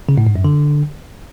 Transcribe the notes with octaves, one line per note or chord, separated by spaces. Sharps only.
C#3
A2
G#2
F#2
D3